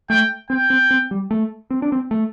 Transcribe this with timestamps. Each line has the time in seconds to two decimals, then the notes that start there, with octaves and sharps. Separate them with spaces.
0.10 A3 G5
0.50 C4 G5
0.70 C4
0.91 C4
1.11 G3
1.31 A3
1.70 C4
1.82 D4
1.92 C4
2.11 A3